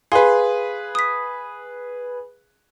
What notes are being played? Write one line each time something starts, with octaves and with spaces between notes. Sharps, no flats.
G#4 B4 F5 G#5 C6
D#6 B6